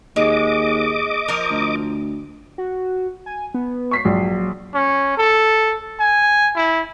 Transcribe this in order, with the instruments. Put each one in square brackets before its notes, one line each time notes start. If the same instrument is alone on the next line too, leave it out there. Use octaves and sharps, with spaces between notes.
[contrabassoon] D#2 [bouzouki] G#3 [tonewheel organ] D#5 D6
[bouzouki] F3 A#4
[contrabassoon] D2
[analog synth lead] F#4
G#5
B3
[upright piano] C#6 B6 C7
[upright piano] A#1 [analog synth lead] F#3
[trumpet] C#4
A4
G#5
E4